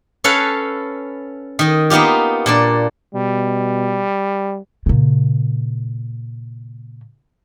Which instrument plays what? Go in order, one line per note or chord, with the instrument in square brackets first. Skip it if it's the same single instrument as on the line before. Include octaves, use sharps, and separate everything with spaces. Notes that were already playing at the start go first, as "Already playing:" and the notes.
[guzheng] C#4 A4 B4 F5 F#5 G#5
D#3 D#5
A#3 B3 D#4 F4 G4
A#2 D4 D5
[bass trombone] B2 [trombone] G3
[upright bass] A#2 C#3